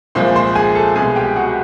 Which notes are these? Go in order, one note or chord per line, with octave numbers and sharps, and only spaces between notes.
C2 A#2 F3 G#3 C5 C6
C5 C6
G#4 G#5
A4 A5
C2 B2 G#3 G#4 G#5
G4 G5
F#4 F#5